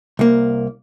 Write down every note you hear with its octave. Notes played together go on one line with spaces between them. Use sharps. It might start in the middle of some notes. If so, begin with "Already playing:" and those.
C2 A#3